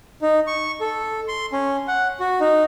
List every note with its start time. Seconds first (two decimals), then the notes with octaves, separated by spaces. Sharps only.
0.22 D#4
0.47 C#6
0.81 A4
1.28 C6
1.52 C#4
1.88 F#5
2.20 F#4
2.41 D#4